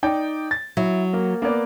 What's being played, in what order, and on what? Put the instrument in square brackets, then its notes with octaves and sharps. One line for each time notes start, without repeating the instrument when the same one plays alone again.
[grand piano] D#4 D5 G5
A6
[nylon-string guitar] F#3 [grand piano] E4
[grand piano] A#3
A#3 B3 D5